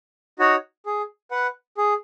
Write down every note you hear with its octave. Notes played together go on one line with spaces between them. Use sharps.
D#4 F#4 C#5 F#5
G#4
B4 F#5
G#4